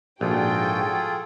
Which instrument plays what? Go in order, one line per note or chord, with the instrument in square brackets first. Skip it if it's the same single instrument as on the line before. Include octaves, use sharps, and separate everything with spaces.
[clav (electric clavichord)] A#1 [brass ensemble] G#2 F#4 [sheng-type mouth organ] F4 G#4 A4 [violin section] G5